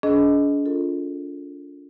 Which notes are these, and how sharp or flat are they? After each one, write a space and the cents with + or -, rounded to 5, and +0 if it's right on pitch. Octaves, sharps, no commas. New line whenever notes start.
D4 -45 G#4 +35 D#5 +0
F4 +0 A4 +25